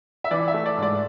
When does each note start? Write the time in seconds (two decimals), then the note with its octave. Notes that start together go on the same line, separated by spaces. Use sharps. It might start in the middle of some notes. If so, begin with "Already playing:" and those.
0.24 E5
0.31 E3 D5
0.48 E5
0.54 A3
0.66 D5
0.77 G#2
0.82 D5